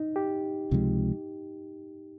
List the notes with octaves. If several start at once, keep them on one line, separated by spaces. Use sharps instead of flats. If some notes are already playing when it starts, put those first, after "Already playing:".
Already playing: D#4
G4
C#2 C3 F3 G#3